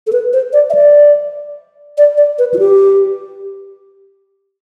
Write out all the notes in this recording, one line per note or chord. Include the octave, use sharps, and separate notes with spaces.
A4
B4
C5
D5
E5
D5
D5
D5
B4
F4
G4